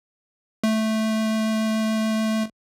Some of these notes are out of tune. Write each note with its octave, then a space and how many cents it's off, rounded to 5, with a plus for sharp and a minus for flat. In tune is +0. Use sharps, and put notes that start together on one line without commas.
A3 -5